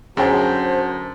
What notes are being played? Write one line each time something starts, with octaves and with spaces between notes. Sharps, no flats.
F#2 D3 F#4 G#4 C5 C#5 G5 A5